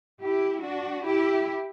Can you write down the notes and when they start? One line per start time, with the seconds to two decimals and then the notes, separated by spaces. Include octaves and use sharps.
0.21 E4 G4
0.62 D4 F#4
1.04 E4 G4